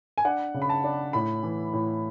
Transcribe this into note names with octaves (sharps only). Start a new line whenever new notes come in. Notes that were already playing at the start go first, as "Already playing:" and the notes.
G#5
D4 F#5
C#3
B5
A5
D4
A2 B5
E3
A2